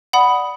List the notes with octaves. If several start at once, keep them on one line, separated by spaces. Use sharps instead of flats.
D5 F#5 B5 D#6